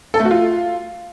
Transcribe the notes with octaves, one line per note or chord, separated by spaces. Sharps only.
A4
A3
F#4
F4